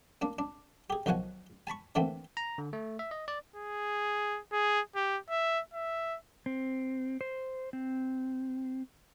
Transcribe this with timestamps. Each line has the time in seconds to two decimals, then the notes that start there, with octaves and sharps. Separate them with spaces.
0.21 A#3 D4
0.39 D4
0.90 G4 G#4
1.06 B1 D#3 F3 F#4 F#5 G#5
1.67 G#5 A5 B5 C#6
1.95 D3 E3 A3 A#3 C4
2.37 A#5
2.58 D3
2.73 A3
2.99 E5
3.11 D#5
3.28 D5
3.56 G#4
4.52 G#4
4.96 G4
5.30 E5
5.74 E5
6.46 C4
7.21 C5
7.73 C4